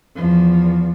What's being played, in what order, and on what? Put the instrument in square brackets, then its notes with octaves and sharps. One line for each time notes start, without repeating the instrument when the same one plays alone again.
[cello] E2 F3